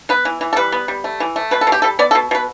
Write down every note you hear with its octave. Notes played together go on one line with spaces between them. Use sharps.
B3 B4
E3
E3
A4
G3 B4
B3
G3
A3
E3
A3
B2 B4
A4
B2
G4
G3 A4
B3 D5
A4
B2
B2 B4